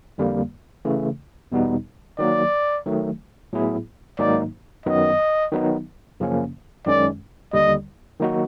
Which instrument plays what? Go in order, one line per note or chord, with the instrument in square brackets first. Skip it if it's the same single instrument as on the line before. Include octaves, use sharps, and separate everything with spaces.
[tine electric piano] F2 D3 G3 A#3
C#3 E3 A3
E2 B2 G3 B3 D#4
[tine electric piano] D#3 F#3 A#3 [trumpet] D5
[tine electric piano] D#3 F#3 A3
A2 F#3 B3 E4 G#4
[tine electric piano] G#2 D#3 F#3 A#3 D#4 [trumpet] D5
[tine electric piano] F#2 D#3 F#3 B3 [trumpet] D#5
[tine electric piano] D#3 F#3 B3 D#4
F#2 C#3 F3 A#3 C#4
[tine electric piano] F#2 D#3 G#3 C#4 [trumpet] D5
[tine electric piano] D#2 D3 G3 [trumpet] D#5
[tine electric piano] D#3 F#3 A#3 D#4 F#4